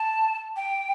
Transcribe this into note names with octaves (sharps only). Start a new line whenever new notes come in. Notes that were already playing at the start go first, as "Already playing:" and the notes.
Already playing: A5
G5